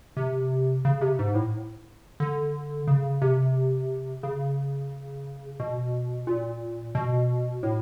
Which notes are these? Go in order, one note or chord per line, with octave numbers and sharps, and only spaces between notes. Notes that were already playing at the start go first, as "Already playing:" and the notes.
C3
C#3
C3
G#2
A2
D3
C#3
C3
C#3
B2
A#2
B2
A2